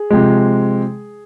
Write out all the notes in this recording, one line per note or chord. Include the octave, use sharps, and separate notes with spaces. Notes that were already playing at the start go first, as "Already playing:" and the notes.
Already playing: G#4
C3 F3 G#3